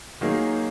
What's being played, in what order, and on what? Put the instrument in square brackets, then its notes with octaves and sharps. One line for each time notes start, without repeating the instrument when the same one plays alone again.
[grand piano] D#3 F#3 A#3 D#4 G#4